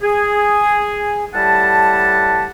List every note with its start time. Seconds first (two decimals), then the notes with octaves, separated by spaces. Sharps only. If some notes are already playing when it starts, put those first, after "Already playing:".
0.01 G#4
1.34 A2 G3 G4 F#5 A5